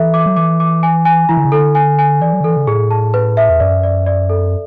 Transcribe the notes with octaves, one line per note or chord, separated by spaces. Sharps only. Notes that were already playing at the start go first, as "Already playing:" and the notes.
Already playing: E3 A4 E5
D6
F#3
E3 D6
D6
G#5
G#5
E3 E4
D3
C#3
D3 A4
G#5
G#5
E3 D5
F#3
D3
E3 A4
C#3
A2 G#4
A5
B4
E5
E2
F#2 D5
D5
D5
A4